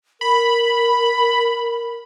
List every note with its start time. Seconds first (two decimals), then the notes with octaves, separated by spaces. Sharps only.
0.21 A#4 B5